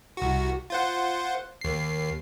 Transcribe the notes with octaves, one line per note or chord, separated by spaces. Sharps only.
C2 F#4
F4 C5 F#5
D#2 C7